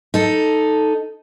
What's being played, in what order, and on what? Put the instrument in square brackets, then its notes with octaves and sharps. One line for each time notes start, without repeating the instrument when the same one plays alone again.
[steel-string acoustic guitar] D#4 A4